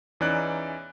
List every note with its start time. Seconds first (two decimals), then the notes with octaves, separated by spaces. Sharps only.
0.20 E2 E3 C#4 D#4 D5 F#6